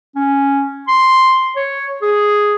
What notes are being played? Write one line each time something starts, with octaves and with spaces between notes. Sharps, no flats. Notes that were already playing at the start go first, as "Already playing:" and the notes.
C#4
C6
C#5
G#4